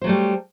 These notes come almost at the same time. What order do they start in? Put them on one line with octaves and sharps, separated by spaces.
C5 F#3 A3 G3